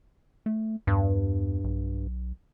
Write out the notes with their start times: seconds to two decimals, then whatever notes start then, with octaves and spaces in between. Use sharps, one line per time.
0.46 A3
0.87 E2 G2
1.64 B1